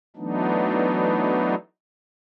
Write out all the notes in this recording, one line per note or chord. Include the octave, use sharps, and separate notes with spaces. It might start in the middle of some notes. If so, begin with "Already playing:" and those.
E3 F#3 A3 B3 D4 D#4